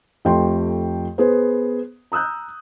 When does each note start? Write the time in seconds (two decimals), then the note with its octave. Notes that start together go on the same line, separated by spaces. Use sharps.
0.25 F2 A3 G4 G5 C6
1.18 B3 G#4 B4 C5
2.12 A#5 D#6 E6 F#6 G6